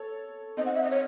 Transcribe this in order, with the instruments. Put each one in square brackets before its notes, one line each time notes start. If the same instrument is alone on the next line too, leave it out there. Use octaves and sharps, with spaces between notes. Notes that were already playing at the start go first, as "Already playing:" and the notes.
Already playing: [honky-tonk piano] A4 C#5
[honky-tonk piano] C4 D#4 [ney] D#5
[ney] F#5
E5
D#5
C#5